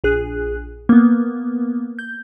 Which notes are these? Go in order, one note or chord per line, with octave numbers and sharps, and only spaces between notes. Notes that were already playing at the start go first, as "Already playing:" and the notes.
A#1 G#4 F#6
A#3 B3
G6